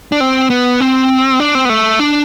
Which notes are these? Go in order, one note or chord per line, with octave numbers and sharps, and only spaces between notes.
D4
C4
B3
C4
D4
C4
B3
A3
D4